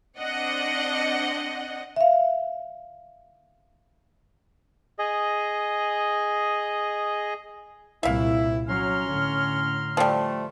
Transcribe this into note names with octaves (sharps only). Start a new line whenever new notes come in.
C4 D4 D#5 F#5
E5 F5
G#4 D#5
C2 A#2 E4 E5 F5
F#3 C#4 C#5 A#5 C6 F6
A2 D3
F3 G3 A3